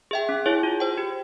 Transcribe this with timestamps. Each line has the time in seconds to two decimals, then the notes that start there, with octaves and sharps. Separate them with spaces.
0.11 G#4 E5 G5
0.29 C#4
0.46 E4 G#4 C#5
0.63 F4
0.80 C5 G5
0.98 G4